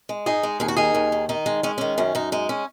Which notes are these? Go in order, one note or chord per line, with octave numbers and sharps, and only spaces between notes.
G#3
G#2 D#4 G#4
G#3
D#2 G#4
F#4
D#3 D#4 G#4
D#2
D#3
D#3 D#4
G#3
G#3 C#4
D#3 C#4
F#2 C#4
F#2 D#4
G#3 D#4
C#4